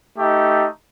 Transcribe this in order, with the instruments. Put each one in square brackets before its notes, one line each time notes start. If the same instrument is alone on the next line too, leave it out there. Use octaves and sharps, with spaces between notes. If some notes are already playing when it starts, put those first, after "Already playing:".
[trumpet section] A3 D#4 G4